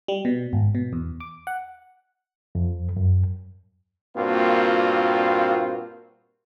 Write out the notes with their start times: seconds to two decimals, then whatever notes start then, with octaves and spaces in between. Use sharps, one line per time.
0.08 G3
0.25 B2
0.53 G#1
0.75 B2
0.93 E2
1.20 D6
1.47 F#5
2.55 F2
2.97 F#2
4.16 G2 A#2 A#3 C4 F4 F#4